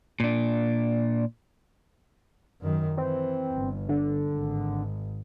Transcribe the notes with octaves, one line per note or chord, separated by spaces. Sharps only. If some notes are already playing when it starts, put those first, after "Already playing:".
A#2 D4
F#2 D#3
E3 C4
G1
D3
G#1